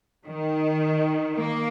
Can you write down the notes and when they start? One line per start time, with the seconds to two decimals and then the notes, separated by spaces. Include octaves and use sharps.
0.25 D#3
1.36 A#3